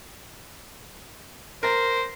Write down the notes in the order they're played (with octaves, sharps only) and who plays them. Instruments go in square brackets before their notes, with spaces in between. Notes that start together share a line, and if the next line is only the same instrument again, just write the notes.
[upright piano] A#4 A#6 [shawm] C5